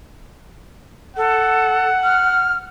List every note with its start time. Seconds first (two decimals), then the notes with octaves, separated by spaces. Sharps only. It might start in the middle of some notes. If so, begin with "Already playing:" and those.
1.17 A4 F#5
2.04 F6